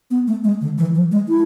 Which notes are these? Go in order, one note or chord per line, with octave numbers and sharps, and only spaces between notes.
B3
A3
G#3
D3
E3
F3
G#3
E4